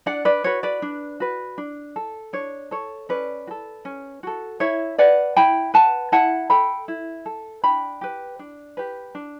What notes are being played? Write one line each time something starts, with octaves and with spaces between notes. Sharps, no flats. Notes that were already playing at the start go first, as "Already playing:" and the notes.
D4 D5 F#5
B4 D5
F#4 B4 C#5
B4 D5
D4
F#4 B4
D4
A4
D4 C#5
A4 C#5
C#4 B4 D5
F#4
A4
C#4
F#4 A4
E4 C#5 E5
B4 D5 F#5
E4 G5 B5
B4 F#5 A5
E4 F#5 A5
A4 G5 B5
E4
A4
D4 G5 B5
G4 B4
D4
G4 B4
D4